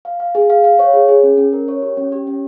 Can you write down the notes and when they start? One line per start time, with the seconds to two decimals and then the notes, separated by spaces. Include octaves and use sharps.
0.05 F5
0.20 F5
0.35 G#4
0.50 F5
0.64 F5
0.79 C#5
0.93 G#4
1.08 G#4
1.23 C#4
1.37 C#4
1.53 A#4
1.68 C#5
1.82 G4
1.97 C#4
2.12 G4
2.27 C#4